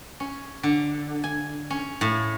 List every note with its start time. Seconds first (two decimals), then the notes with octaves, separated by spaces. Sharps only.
0.20 C#4
0.63 D3
1.24 G#5
1.70 C#4
2.01 A2